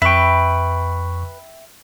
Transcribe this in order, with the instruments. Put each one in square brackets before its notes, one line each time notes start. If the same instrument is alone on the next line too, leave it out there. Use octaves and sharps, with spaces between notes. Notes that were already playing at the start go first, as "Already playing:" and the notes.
[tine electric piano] F2 C#6 [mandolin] B4 [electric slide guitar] E5 G5